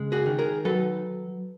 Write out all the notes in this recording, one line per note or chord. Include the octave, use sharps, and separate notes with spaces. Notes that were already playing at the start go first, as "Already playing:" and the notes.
Already playing: C#3 G#3
F#4 G#4
D#3
G#4 A#4
F#3 A4 B4